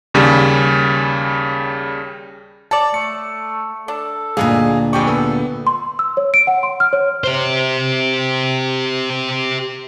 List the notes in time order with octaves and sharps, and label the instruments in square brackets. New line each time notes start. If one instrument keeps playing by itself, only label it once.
[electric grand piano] D#2 C#3 G3 C#4
[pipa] A4 C#5 D5 [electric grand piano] A5
[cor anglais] A3 [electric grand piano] C#7
[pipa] D4 [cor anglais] A4
[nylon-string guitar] D2 A#2 [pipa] G3 B3 D#4 [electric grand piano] G#4 F5
[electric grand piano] F2 G5 C#6 [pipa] E3 G3 G#5 [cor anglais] G4
[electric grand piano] B3 [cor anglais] A4
[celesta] C6
E6
C#5
D7
F#5
C6
F6
C#5
[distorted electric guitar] G4 C5